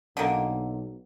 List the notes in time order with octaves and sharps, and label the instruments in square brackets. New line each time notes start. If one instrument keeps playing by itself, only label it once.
[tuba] B1 [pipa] D3 D#3 A#3